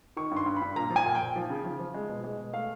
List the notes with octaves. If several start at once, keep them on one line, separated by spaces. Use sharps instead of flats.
D#3 C#6
G2
C6
G2
B5
G2
A#2 A#5
F3
G#5
A#2
G5
A#2
F3
C#3
F3
F3
G#3
B2
G#3
B2
A3 F5